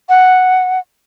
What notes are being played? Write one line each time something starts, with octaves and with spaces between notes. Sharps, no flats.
F#5